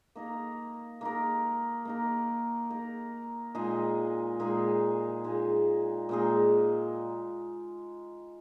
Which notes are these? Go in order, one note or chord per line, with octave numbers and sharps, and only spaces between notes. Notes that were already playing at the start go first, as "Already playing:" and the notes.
A#3 D#4 A#4
A#3 D#4 A#4
A#3 D#4 A#4
A#3 D#4 A#4
A#2 G#3 D#4 G#4
A#2 G#3 D#4 G#4
A#2 G#3 D#4 G#4
A#2 G#3 D#4 G#4